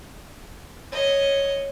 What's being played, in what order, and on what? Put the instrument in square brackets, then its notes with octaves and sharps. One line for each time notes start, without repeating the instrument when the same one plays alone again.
[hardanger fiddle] C#5 D#5